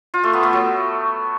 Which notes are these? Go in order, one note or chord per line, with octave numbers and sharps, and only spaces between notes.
F4
A3
B3
A3
F#3